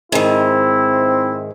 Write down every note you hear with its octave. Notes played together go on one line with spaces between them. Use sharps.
G#2 D#3 C4 E4